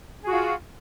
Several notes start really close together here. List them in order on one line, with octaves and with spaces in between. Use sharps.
G#4 F#4 F4